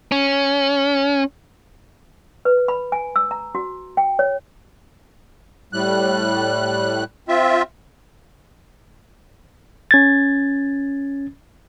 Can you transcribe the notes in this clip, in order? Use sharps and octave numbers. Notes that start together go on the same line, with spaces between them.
C#4
B4
B5
G#5
E6
A#5
F#4
G5
C#5
A2 G3 F#6
C4 F4 E5
C#4 G#6 A6